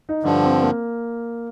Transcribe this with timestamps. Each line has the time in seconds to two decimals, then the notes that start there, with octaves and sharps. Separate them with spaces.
0.09 D#4
0.23 G2 D3 F3 D4
0.43 C4
0.63 A#3